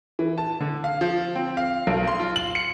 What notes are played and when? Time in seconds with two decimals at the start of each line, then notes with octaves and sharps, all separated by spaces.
0.19 E3
0.38 A5
0.60 D3
0.84 F5
1.01 F3
1.35 C4
1.57 F5
1.87 B1
2.07 C6
2.20 F4
2.36 F#7
2.55 C#7